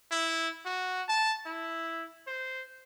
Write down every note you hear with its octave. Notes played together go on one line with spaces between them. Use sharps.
E4
F#4
A5
E4
C5